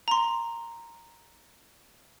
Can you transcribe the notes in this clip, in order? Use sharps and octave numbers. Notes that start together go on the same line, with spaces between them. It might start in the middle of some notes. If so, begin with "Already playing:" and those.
A#5 C6